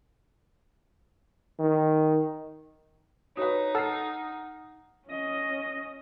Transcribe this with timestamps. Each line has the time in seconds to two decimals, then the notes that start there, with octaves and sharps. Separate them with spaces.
1.59 D#3
3.37 D#4 F#4 B4 C#5 D#6
3.75 A4 F#5 F6 C7
5.08 C#4 D#5